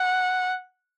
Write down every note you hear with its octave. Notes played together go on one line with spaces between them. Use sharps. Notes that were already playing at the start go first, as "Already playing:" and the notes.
Already playing: F#5